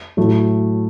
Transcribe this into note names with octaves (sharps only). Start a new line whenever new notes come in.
A2 F#3 A3